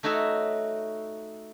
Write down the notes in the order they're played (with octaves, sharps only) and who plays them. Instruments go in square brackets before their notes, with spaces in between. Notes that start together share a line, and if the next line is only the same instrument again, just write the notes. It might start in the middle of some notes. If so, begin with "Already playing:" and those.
[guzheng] A3 D#4 F#4 C#5 E5